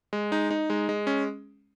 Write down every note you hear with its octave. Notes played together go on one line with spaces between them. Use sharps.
G#3
D#4
D#4
G#3
G#3
C#4